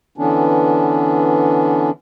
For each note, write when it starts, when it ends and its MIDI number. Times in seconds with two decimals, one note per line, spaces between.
0.18 1.90 50
0.18 1.90 52
0.18 1.90 59
0.18 1.90 61
0.18 1.90 62